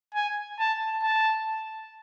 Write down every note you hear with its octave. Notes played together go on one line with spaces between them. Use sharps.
G#5
A5
A5